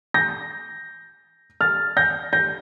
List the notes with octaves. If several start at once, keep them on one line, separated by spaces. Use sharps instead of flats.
G6 A#6
F6 A6
G6 A#6
G6 A#6